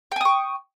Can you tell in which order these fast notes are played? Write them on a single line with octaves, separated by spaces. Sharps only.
G5 G#5 D#6 C#6